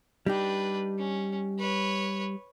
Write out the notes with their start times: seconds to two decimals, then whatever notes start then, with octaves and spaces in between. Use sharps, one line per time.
0.26 G3 D4 D#4 G4 B4
0.98 C#4
1.59 B4 C#5